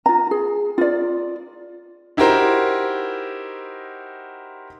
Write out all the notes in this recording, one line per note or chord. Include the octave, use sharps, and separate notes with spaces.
F4 A#5
G#4
F4 D5
D#4 E4 F#4 G4 A#4 C5